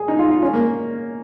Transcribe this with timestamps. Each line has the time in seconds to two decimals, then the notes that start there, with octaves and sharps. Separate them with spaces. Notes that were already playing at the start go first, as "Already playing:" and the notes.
Already playing: G#4
0.08 D#4
0.19 F4
0.31 F4
0.42 C#4
0.53 A#3